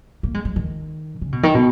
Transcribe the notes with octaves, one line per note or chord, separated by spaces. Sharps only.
A#3
G#3
F#3
D#3
C#3
B2
D#3
B2